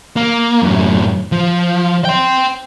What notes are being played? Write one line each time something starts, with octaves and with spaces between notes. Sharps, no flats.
A#3
F#2 A2
F3
G5 C6